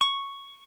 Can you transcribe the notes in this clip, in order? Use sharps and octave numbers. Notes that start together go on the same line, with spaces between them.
C#6